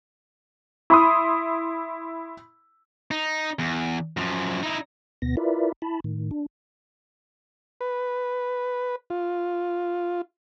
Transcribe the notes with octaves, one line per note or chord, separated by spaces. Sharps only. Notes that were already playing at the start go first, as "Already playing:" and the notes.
E4 B5 C6 D#6
D#4
E2
F#2 F3
D#4 E4
D2 B2 B3 A#6
E4 F4 A#4 B4 D5 E5
E4 A5 B5
A2 D#3
D4
B4
F4